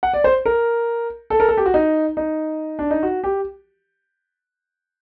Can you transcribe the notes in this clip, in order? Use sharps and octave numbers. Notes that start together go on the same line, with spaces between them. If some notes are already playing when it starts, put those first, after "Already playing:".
F#5
D5
C5
A#4
A4
A#4
A4
G4
F#4
D#4
D#4
D4
D#4
F#4
G4